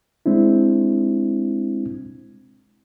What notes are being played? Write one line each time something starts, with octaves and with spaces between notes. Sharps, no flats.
G#3 C4 D4 E4